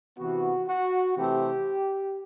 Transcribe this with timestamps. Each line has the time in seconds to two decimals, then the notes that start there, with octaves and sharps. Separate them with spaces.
0.17 C3 E3 B3 F#4
0.67 F#4
1.16 C3 E3 A3 C4 G4